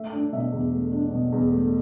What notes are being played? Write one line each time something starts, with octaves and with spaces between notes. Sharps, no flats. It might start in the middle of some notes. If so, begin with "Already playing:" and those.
Already playing: A3 E5
D4
B2 E5
E2
A3
D4
B2
E2
A3